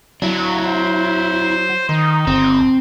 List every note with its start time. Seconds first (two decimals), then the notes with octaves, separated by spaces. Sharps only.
0.22 F#3 D4 E4
0.65 C5
1.89 D#3 D#4
2.27 G1 C4